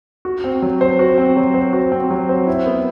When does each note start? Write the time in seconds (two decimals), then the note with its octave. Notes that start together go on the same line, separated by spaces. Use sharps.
0.25 F#4
0.44 C4
0.62 F#3
0.81 C5
0.99 F#4
1.18 C4
1.36 F#3
1.54 C5
1.73 F#4
1.92 C4
2.11 F#3
2.29 C5
2.47 E4
2.66 B3